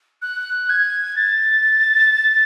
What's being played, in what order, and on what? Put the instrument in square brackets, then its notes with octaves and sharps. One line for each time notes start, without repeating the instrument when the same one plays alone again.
[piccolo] F#6
G#6
A6